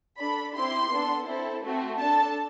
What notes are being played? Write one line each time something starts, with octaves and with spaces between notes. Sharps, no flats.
D4 A4 B5
C4 E4 G4 C6
B3 D4 A4
C4 E4 A4
A3 C4 F#4
D4 A4 A5